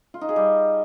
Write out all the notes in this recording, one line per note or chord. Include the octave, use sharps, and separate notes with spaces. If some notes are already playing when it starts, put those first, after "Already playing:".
F4
D#4
G#4
G3